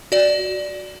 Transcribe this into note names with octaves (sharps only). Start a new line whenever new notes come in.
F#4 D5